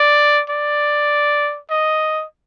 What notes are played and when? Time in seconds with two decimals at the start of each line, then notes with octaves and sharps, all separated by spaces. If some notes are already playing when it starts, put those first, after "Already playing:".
Already playing: D5
0.50 D5
1.70 D#5